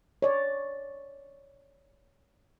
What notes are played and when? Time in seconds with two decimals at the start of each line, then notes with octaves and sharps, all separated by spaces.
0.22 C#5 D5